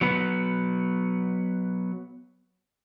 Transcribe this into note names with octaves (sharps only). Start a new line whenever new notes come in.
F#3 B3 B4